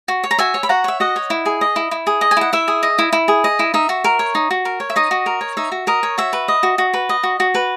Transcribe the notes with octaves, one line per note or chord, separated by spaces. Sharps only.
F#4
C#5
A#5
F#4 E5 G#5
C#5
B5
F#4 F#5 A#5
C#5 E5
F#4 D#5 F#5
C#5
E4
G#4
D#5
E4
E4
G#4
D#5
G#5
E4 F#5
E4 E5
G#4
D#5
E4
E4
G#4
D#5
E4
D#4 E5
F#4
A#4
C#5
D#4
F#4
A#4
C#5
E5
D#4 D#5
F#4
A#4
C#5
D#4 E5
F#4
A#4 D#5
C#5
F#4 E5
B4
D#5
F#4
F#4
B4
D#5
F#4
F#4
B4